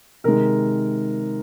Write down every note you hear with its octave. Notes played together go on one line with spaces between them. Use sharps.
C3 D#3 G#3 A#4